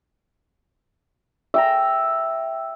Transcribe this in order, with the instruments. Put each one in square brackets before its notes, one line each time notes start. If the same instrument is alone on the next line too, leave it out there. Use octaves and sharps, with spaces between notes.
[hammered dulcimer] E5 G5 A#5